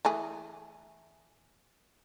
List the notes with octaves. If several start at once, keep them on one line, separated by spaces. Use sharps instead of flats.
E3 A3 G#4